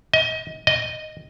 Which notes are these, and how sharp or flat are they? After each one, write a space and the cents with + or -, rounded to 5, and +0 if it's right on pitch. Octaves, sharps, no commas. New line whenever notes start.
D#5 +30
D#5 -5